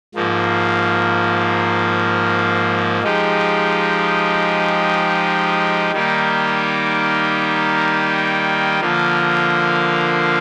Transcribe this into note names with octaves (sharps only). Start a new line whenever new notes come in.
G#2 F3 A#3
F3 G#3 D#4 G4
D#3 G3 A#3 D#4 G4
D3 F3 A#3 F4